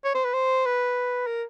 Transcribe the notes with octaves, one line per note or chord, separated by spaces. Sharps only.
C#5
C5
B4
C5
B4
A#4